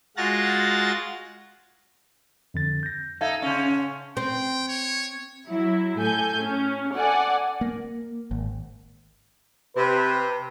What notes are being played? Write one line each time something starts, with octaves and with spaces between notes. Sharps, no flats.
G#3 F4 F#4 A#5 F#6 A6
F2 D3 A6
G6 A#6
D#4 A4 E5 F5 G#6
C#3 C#4
C4 G5
C#5
F#3 E4
A2 A4 G#5 G6
C#4
A4 D5 F#5 G#5
A#3
G#1
C3 B4